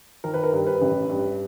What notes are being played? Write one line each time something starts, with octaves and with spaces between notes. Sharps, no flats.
D#3 A#4
B4
A#4
G2
B4
A1
G2